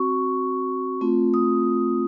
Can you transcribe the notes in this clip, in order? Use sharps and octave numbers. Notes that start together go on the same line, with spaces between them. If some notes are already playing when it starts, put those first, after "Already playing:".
Already playing: C4 F#4 C#6
A3 C4 F4
D#6